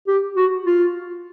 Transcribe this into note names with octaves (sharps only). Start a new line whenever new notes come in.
G4
F#4
F4